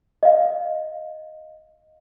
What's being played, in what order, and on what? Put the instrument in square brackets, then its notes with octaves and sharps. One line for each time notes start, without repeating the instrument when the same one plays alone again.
[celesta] D#5 F5